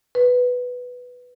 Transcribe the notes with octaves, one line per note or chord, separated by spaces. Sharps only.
B4